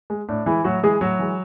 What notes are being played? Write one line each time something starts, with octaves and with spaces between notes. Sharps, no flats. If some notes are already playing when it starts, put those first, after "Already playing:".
G#3
A2 D4
E3 G#3 E4
A2 F#3 F#4
E3 G#3 G#4
A2 F#3 F#4
E3 G#3